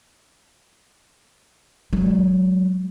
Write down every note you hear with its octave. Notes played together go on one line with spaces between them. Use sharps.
F#3 G#3